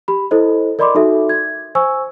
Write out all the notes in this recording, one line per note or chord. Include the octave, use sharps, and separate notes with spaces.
G4 B5
E4 A4 C5 D#5
A#4 D5 D#5 B5 C6 D6
D#4 F#4 A4 E5
G#6
C5 G#5 C#6 E6